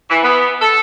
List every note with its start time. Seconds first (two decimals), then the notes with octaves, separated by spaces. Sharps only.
0.09 E3
0.23 B3
0.61 A4